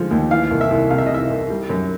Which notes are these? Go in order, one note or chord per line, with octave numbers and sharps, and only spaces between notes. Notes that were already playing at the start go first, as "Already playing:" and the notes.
Already playing: D3 F3 G#3
D#2
E3 F5
C2
E5
C2
C3 F5
E5
D#5
E3 E5
C2
G3
F#2